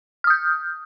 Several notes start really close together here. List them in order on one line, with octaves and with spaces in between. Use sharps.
F6 D#6 G6